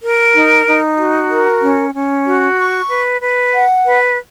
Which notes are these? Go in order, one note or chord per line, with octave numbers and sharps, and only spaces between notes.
A#4
D#4
D#4
F#4
A#4
C#4
C#4
F#4
C#6
B4
B4
F#5
B4